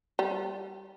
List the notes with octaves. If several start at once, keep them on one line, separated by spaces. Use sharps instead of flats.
G3